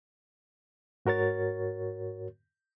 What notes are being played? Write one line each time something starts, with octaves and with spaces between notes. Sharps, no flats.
G#2 F#4 A#4 C#5 A6